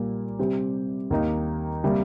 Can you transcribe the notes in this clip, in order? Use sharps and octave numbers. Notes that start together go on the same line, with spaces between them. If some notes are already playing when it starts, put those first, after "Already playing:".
Already playing: A#2 G3 A#3
C3 G3 C4 G4
D#2 D#3 A#3 D#4
C3 G3 A#3